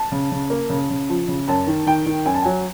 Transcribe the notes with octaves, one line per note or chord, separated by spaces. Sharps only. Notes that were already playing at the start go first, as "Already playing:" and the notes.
Already playing: A5
C#3
C#3
A#3
C#3
C#3
F3
C#3
F#2 A5
D#3
D#3 G5
D#3
F#2 G#5
A5
F#3 G#5